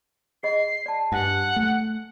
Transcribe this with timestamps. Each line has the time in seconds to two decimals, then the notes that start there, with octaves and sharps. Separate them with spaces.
0.43 G#4 D#5 C7
0.86 D5 A5
1.12 G2 F#5 G#5
1.56 A3